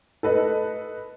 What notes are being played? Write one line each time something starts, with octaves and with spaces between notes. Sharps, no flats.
A4 B4 D#5